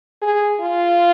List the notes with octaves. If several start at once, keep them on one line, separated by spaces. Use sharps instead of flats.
G#4
F4